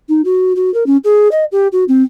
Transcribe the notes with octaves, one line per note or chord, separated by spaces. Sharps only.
D#4
F#4
F#4
A#4
C#4
G#4
D#5
G4
F#4
C4